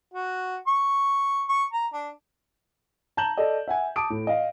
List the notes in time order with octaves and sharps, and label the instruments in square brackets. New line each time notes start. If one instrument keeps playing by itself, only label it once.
[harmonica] F#4
C#6
C#6
A#5
D4
[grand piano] A5 A#5 G6 E7 F#7
A4 D5 D#5
E5 F#5 G#5
A5 D6 D#6 D7
A2
D#5 F5